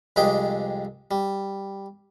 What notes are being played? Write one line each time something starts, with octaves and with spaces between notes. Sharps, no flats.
C2 F2 G#3 D4 G4 D#5
G3